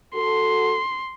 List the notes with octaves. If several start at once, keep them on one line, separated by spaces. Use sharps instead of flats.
F#4 A4 C6